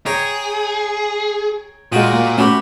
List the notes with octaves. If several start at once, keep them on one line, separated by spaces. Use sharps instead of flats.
G#4 C#5 G5 A#5
A#2 G#3 F4 F#4 G5 D#6
A#3
A3 C#4 F#4 G4 B4